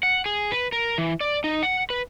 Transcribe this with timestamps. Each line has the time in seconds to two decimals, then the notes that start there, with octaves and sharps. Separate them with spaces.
0.03 F#5
0.26 G#4
0.52 B4
0.72 A#4
0.98 E3
1.21 D5
1.44 D#4
1.63 F#5
1.90 B4